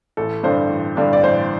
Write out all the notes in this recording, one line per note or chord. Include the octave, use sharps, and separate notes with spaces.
A1 A4
G2 D3 G3 D4 C5
A1
G2 D3 G3 D4
D5
A1 C5